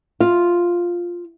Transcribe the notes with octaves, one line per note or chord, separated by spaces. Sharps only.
F4